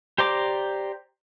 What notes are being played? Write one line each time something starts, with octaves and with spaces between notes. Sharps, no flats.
G4 C5 D5 A#5 D6